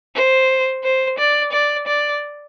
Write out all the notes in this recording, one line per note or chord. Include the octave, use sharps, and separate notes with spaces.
C5
C5
D5
D5
D5